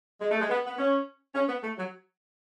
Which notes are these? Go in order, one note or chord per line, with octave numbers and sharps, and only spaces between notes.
G#3
A3
G#3
B3
B3
C#4
C#4
B3
A3
F#3